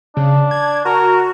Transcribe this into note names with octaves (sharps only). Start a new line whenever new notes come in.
C#3 D4
G#6
F#4 A#4